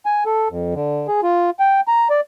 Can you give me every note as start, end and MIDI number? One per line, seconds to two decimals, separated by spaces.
0.06 0.24 80
0.26 0.48 69
0.50 0.74 41
0.74 1.07 50
1.08 1.21 68
1.23 1.50 65
1.59 1.81 79
1.88 2.08 82
2.10 2.21 74